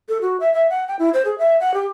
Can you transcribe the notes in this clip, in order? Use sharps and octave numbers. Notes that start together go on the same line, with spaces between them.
A4
F#4
E5
E5
F#5
G5
E4
C5
G#4
E5
F#5
G4